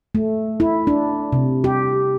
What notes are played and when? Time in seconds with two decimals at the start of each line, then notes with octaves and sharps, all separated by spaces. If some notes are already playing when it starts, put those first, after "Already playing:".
0.15 A3
0.60 E4
0.87 D4
1.33 C3
1.64 G4